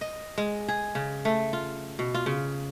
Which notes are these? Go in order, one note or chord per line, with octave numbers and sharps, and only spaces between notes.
D#5
G#3
G#4
C#3
A3
F4
B2
F4
C#3